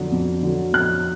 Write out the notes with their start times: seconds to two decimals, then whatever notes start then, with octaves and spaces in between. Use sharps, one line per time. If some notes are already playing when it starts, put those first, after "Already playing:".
Already playing: F2 D3 F#3
0.12 F2
0.43 D3 F#3
0.73 F2 F#6